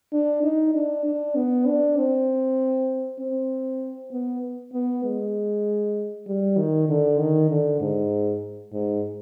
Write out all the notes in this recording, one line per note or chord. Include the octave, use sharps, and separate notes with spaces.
D4
D#4
D4
D4
B3
D4
C4
C4
B3
B3
G#3
G3
D#3
D3
D#3
D3
G#2
G#2